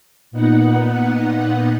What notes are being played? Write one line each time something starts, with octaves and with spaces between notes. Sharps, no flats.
A#2 B3 D#4 F#5